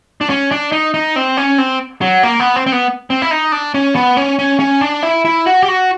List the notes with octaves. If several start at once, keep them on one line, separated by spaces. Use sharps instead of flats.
D4
C#4
D4
D#4
D#4
C4
C#4
C4
F#3
A#3
B3
C4
C4
B3
C4
E4
D#4
D4
C#4
B3
C#4
C#4
C#4
D4
E4
E4
F#4
G4
F#4